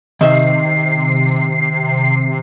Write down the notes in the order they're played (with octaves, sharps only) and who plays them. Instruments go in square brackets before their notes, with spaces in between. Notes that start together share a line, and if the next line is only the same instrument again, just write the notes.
[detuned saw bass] C3 [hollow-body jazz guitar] D#3 E5 [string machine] C7